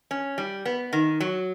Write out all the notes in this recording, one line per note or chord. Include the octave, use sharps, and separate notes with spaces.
C#4
G3
B3
D#3
F#3